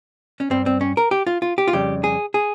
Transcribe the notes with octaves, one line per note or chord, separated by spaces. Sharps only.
C#4
G2 G3 C4
C4
C#4
A#4
G4
F4
F4
G4
F4
F2 C#3 G3 G4
G#4
G#4